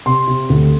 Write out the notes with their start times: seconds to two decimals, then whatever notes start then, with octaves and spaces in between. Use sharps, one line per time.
0.06 C3 C6
0.27 C3
0.50 D2